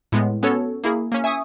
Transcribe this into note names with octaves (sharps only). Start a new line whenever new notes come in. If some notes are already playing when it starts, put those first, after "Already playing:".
A2 G#3 B3
B3 C#4 F#4 A4 C#5
A#3 E4 G#4
A#3 C#4
E5 G#5 C#6 D#6